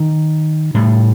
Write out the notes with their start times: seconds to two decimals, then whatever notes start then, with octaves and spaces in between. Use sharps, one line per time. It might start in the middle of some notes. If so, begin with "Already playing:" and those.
Already playing: D#3
0.74 A2 G3